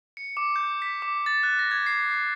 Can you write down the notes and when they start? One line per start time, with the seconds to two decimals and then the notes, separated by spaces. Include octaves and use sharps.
0.17 C#7
0.37 D6
0.56 G6
0.82 B6
1.02 D6
1.26 A6
1.43 F#6
1.59 A#6
1.71 G#6
1.86 C7
2.11 C7